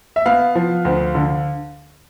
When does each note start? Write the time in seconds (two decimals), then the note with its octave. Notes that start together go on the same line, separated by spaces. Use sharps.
0.16 E5
0.26 B3 F5
0.55 F3
0.85 D2
1.15 D3